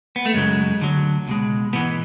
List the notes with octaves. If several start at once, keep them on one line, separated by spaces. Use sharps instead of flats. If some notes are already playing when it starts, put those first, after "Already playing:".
B3
A3
F#2 C#3 F#3 G#3
D2 D3 F#3
C#2 B2 G#3
G#2 B2 E3 G#3 B3